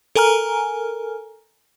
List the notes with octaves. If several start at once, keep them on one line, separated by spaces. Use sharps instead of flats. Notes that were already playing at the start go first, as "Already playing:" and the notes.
A4 A#4 G#5 A#5 F6